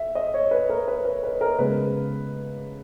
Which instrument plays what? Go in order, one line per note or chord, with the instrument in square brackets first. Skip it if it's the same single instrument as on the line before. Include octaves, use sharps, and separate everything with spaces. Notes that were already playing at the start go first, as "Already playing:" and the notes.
Already playing: [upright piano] E5
D#5
C#5
B4
A#4
B4
B4
B4
A#4
C#3 G#3 B3 B4